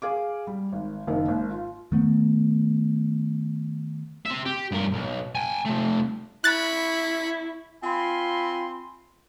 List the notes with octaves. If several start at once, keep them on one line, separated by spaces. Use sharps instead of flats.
G#4 F5 D6
G3
G#1
F#1 D#3 A#3
G#1
F4
D#3 A3 B3
C4 E5
G4
G2 A#4
B1
G5 G#5
C3 A3
E4 B5 C#6 F#6 A6
C4 F4 G#5 B5 C6